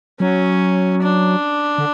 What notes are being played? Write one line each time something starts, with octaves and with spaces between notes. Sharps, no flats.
F#3 C#4
D4
D3